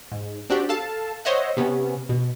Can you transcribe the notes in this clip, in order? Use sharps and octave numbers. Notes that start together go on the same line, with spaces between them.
G#2
C4 D4 F#4 G4
A4 F5 A5
C5 C#5 D#5 E5 F#5
C3 B3 C#4
B2